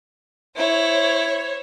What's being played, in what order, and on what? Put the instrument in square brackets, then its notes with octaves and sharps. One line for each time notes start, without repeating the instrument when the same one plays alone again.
[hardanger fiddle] E4 [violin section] C5 C#5